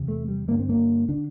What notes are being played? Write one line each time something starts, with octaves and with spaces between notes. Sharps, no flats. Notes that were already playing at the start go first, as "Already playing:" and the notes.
Already playing: E2 C3
A3
G3
G2 D3 A#3
C4
A#3
D3 D4